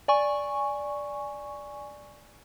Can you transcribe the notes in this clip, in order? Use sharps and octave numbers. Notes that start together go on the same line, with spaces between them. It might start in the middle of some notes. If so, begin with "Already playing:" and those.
D5 G#5 C#6